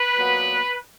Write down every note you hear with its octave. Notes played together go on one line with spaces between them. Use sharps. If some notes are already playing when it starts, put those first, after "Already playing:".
Already playing: B4
A#2 F#3 B3